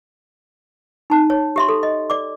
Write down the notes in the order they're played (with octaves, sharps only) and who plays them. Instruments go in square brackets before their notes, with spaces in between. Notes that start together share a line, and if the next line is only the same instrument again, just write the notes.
[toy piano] D#4 A5
C#5
G4 E5 C6
A4
D#5
D5 D6